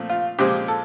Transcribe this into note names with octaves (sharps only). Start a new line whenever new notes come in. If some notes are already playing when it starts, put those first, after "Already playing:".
Already playing: A#2 F3 A3 C4
F4
A#2 F3 G#3 C4 G4
A4